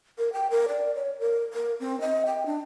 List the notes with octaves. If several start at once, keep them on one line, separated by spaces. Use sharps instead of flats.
A#4
G5
A#4
D5
C#5
A#4
A#4
C4
D#5
G5
D4